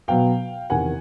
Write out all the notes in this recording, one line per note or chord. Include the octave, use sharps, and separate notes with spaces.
B2 F#3 B3 F5 G5
E2 C3 D#3 F#5 G#5